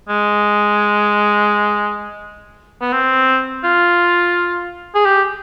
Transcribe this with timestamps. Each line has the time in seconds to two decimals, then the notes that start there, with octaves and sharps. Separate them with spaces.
0.09 G#3
2.81 B3
2.93 C4
3.64 F4
4.95 G#4
5.06 G4